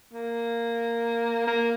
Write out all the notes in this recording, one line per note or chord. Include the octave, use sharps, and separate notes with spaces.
A#3
A#3